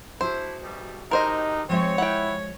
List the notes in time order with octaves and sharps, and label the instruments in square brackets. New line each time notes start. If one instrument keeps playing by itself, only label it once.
[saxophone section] D4 E4 [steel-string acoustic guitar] F#4 G#4 E5 [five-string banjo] C5
[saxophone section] D2 B2 G3
[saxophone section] A2 G#3 G4 [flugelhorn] D#4 [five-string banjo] A#4 C5 D#5
[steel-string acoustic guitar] F3 G#3 E5 [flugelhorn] C4 [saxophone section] C#5
[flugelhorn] E4 [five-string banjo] F#5 G5